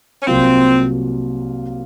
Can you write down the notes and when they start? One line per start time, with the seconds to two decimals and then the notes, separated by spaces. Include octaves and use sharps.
0.22 C#4
0.27 C2 C3 F#3 A#3 C4 F4